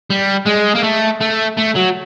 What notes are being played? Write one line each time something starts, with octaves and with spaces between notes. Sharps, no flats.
G3
G#3
A#3
A3
A3
A3
F#3